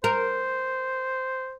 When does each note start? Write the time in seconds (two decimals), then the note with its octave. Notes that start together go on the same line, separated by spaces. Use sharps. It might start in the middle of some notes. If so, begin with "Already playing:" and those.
0.04 A#4 C5